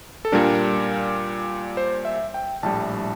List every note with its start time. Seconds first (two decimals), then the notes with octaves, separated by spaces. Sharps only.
0.25 A4
0.32 A#2 G3 D4 A#4
1.77 C5
2.05 E5
2.34 G5
2.63 A#1 A2 G3 A5